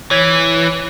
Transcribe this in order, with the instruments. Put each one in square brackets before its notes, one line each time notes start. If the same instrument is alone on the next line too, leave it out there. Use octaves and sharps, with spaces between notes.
[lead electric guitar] E3 [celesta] C#5 G#6 B6